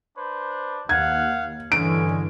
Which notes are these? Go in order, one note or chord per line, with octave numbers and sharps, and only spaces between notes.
D4 B4 C5
D#2 F5 F#5 G#6
G2 D3 E3 G#3 C#4 D7